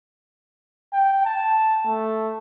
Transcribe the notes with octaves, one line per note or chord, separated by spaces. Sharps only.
G5
A5
A3